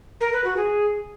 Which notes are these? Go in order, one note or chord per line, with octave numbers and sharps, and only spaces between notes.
A#4
B4
F#4
G#4